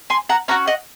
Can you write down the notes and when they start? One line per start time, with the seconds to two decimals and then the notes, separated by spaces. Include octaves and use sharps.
0.10 G#5 C6
0.29 F#5 A#5
0.48 C#4 F#4 F#5 A#5
0.67 D#5 F#5